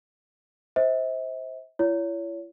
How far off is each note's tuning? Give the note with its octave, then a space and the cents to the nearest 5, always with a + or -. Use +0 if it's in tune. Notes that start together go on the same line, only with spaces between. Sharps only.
C5 +0 E5 -40
E4 +40 C#5 +30